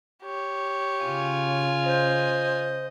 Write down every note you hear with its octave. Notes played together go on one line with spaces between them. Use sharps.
G4 C#5
C#3 F4 G#5
C5 D#5